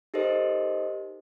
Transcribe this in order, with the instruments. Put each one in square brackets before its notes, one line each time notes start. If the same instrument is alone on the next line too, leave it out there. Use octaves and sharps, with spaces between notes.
[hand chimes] D#4 G4 A4 A#4 C5 D#5